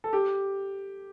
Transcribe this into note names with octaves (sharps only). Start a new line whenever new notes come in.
A4
G4